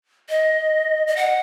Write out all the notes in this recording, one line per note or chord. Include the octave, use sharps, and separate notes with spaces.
D#5
D#5
F#5